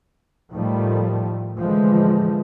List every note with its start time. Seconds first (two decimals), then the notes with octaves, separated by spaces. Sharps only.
0.53 A2 D#3 F3 G3 A3
1.58 A2 D3 E3 F3 G#3 A3